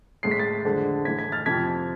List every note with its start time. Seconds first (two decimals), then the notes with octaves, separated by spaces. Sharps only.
0.23 A2 G#3 C7
0.31 B6
0.39 A6 C7
0.64 F2 D3 G#3
1.05 A2 E3 A3 G#6 B6
1.19 G#6 B6
1.32 F6 A6
1.46 F2 C3 F3 G#6 B6